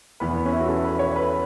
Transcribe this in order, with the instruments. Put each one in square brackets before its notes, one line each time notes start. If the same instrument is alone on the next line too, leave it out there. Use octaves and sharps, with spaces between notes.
[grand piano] E2 E3 B3 B4
B3
C#4
E4
F#4
A4
B4
C#5
B4